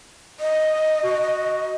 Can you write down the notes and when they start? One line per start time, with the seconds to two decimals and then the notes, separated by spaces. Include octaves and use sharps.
0.40 D#5
1.04 F#4